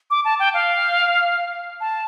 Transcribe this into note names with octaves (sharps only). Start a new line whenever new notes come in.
D6
A5
G5
F5
A5